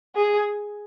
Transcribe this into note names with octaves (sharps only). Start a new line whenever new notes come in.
G#4